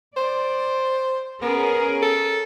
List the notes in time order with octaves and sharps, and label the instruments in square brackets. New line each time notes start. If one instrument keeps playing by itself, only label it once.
[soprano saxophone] C5 [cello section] D5
[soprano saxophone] B3 [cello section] C#4 G#4 A#4
[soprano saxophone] A4